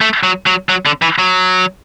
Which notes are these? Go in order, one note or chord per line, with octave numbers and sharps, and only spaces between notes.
A3
F#3
F#3
F#3
D3
E3
F#3